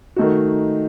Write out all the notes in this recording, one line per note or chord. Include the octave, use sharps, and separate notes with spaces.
D#3 A3 D#4 F#4